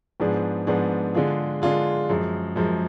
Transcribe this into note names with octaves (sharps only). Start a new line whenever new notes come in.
G#2 F3 B3 D4 G#4
G#2 F3 B3 D4 G#4
D3 G#3 D4 F4 G#4
D3 G#3 D4 F4 G#4
F#2 F3 G#3
F#2 F3 G#3